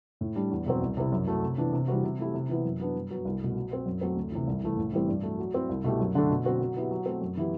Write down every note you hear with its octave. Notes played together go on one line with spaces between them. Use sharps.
A2
G3 D4
E2
B2 F#3 C4
C2
C3 G3 C4 E4
F#2
F#3 A3 E4 A4
C3
E3 B3 D4
C3
E3 G3 C4 F#4
C3
F#3 A3 E4 G4
C3
E3 B3 E4
F#2
F#3 B3 D4
G2
F#3 B3
C2
B2 A3
F#3
C4 F#4 C5
F#2
F#3 A3 C4
D2
C3 E3
C2
C3 E3 A3 E4
A2
E3 G3 C4
G2
F#3 A3
F#3
C4 E4
C2
B2 A3 E4 G4
F#2
D3 A3 D4 A4
B2
F#3 C4 F#4
F#3
B3 E4 G4
F#3
A3 C4
F#2
E3 B3 E4 G4